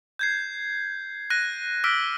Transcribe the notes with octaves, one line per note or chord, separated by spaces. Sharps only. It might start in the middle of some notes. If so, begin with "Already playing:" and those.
G6 G#6 C7
F#6 A#6 D#7
D6 E6 F6 B6 D7 G7